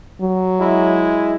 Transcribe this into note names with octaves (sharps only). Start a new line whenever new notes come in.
F#3
G#3 E4